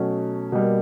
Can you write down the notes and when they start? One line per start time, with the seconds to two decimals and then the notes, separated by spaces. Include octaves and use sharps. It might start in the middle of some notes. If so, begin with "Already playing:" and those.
Already playing: B2 F#3 A3 C#4
0.52 B2 G3 A#3